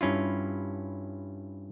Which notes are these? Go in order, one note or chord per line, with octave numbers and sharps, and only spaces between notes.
G2 C#4 E4 F4